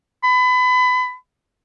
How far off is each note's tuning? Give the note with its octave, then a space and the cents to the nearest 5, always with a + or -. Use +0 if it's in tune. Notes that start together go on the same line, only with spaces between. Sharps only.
B5 +25